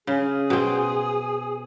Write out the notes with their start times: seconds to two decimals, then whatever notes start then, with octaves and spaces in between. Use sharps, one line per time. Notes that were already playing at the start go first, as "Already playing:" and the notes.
0.07 C#3 G#4
0.50 B2 C4